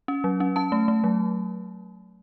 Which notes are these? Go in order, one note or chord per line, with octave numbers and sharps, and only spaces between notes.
C#4
F#3
C#4
C#4 A5
A3
A3
F#3